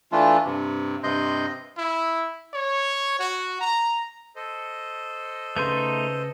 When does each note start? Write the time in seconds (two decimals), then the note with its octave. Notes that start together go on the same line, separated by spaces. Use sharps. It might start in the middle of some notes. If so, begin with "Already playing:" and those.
0.12 E3 A3 D4 F4
0.45 G2 C3
1.03 G2 C3 D#5 C6 G6
1.78 E4
2.54 C#5
3.20 F#4
3.61 A#5
4.36 A4 C5 D#5
5.56 C#3 A3 D#4 B4 C6 G6